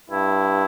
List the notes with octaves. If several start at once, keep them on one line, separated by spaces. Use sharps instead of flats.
G2 E4